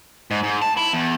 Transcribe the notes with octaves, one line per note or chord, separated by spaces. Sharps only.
G#2
G#2
A5
E4
E2